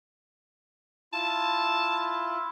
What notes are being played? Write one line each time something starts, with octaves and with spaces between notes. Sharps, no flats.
E4 F4 A5